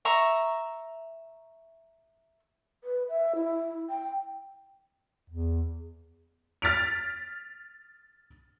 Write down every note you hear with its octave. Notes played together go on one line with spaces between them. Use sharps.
E5 A#5 C#6
B4
E5
E4
G5
E2
F6 A6 B6 D7 F7